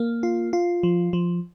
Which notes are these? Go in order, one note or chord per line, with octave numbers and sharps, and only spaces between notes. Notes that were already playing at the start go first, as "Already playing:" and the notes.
Already playing: A#3
F4
F4
F3
F3